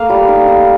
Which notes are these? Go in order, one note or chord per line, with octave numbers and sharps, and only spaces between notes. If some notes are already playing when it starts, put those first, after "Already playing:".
Already playing: A3 A#3 F5
G3
D#4
D#4